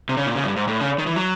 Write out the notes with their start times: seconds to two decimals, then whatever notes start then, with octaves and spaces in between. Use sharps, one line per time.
0.09 C3
0.17 C#3
0.27 A#2
0.35 C#3
0.44 G2
0.56 G#2
0.68 A2
0.80 C#3
0.98 D#3
1.06 E3
1.16 F#3